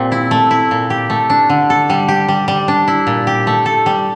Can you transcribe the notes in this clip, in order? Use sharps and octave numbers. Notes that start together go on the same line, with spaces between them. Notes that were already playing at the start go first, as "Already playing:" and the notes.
Already playing: A#2 G3 C4
E4
A3
E4
A#2
G4
A3
D4
D3
A4
G3
G4
G3
G3
D4
E4
A#2
G4
A3
A4
G3